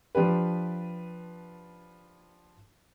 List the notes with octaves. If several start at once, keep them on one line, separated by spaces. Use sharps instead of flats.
F3 D4 G4 B4